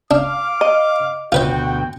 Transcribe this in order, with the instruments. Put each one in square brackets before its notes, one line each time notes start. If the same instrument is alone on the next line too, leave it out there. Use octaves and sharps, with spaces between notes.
[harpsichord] D4 [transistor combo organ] F5 [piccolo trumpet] D6
[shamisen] D#5
[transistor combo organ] D2 B2 G5 [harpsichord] F4 B4 C5 [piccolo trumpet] F#4